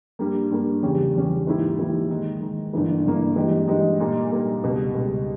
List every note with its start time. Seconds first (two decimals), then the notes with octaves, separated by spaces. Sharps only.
0.19 G2 G3 A#3
0.51 G2 G3 A#3
0.82 E2 C#3 G3 C#4 G4
1.15 E2 C#3 G3 C#4 G4
1.47 G#2 E3 A#3 E4 G4
1.78 G#2 E3 A#3 E4 G4
2.10 D#3 G#3 D#4
2.41 D#3 G#3 D#4
2.73 G1 G2 E3 A#3 E4
3.05 G1 G2 E3 A#3 E4
3.36 G2 E3 G#3 D#4 G4
3.68 G2 E3 G#3 D#4 G4
4.00 A#2 G3 A#3 D#4 A#4
4.31 A#2 G3 A#3 D#4 A#4
4.63 C#2 B2 G3
4.94 C#2 B2 G3